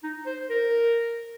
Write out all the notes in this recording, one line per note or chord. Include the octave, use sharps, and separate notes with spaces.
D#4
C5
A#4